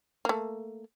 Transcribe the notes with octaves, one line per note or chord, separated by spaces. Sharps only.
A3 A#3